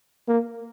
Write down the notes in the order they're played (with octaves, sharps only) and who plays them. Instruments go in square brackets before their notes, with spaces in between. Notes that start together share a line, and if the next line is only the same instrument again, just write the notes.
[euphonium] A#3